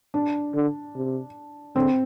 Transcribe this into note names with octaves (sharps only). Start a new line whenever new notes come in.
D4
D3
C3
D3 C4